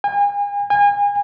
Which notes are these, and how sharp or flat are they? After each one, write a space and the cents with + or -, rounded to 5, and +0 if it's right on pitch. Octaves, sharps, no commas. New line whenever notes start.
G#5 -40
G#5 -35